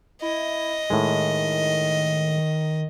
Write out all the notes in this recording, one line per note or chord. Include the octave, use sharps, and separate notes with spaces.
E4 D#5
A2 D#3 G#3